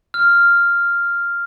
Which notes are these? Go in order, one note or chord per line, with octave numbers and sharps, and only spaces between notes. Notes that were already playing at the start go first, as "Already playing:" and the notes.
F6